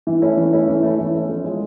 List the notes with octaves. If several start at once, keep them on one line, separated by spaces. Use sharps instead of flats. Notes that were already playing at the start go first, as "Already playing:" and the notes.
E3
A3 C#4 E4
E3
A3 C#4 E4
E3
A3 C#4 E4
E3
A3 C#4 E4
F3
G#3 C#4